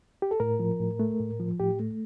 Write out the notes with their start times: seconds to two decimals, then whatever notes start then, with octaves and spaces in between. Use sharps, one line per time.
0.22 G4
0.31 A4
0.40 A2 A#4
0.60 F3
0.80 A2
1.00 A3
1.20 A2
1.40 F3
1.60 A2 G4
1.80 A3